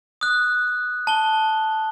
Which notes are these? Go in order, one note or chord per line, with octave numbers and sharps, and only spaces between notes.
D#6 F#6
A5 G7